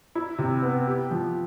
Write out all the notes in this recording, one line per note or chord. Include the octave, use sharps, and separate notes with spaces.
E4
C3
B3
G4
F3